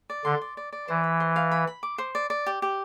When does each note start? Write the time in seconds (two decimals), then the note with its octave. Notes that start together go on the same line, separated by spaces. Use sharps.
0.10 D5
0.25 D3 C6
0.41 D5
0.57 D5
0.73 D5
0.88 E3 C5
1.04 B5
1.20 C5
1.36 F5
1.51 B5
1.67 B5
1.83 D6
1.98 C5
2.15 D5
2.30 D5
2.46 G4
2.62 G4